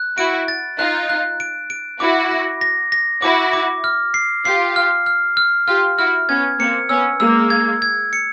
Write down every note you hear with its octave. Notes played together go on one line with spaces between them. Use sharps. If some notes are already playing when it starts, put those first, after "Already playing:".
Already playing: F#6
E4 F#4 D7
A6
D#4 F4 F#6
F#6
D7
D7
E4 F#4 D6
A#6
A#6
A#6
E4 F#4 D6
D6
F6
C7
F4 G4 C7
F6
F6
F6
F4 G4 F6
E4 F#4 F6
B3 C#4 G#6
A#3 C4 C#7
B3 C#4 E6
G#3 A#3 E6
G#6
G#6
C#7